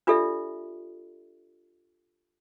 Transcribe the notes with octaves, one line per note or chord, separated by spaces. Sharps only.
D4 F4 G4 A4 D5 E5